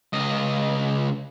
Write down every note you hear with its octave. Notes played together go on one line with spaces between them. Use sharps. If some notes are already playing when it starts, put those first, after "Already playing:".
C#2 D#5